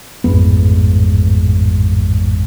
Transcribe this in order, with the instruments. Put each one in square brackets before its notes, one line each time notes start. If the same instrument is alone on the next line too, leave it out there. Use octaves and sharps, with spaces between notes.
[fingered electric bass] A1 F2 G#2 B3